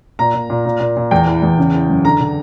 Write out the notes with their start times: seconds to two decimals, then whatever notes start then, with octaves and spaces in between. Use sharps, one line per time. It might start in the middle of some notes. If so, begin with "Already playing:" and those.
0.19 A#2 A#5
0.34 A#2
0.50 A#2
0.66 A#2
0.80 A#2
0.97 A#2
1.11 E2 G5
1.27 E3
1.43 E2
1.58 C#3
1.74 E3
1.89 F#2
2.04 D3 A#5
2.20 D3